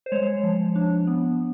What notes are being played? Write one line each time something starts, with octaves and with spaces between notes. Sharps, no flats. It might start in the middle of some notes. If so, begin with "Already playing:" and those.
C5
G#3 C#5
F3
D4
B3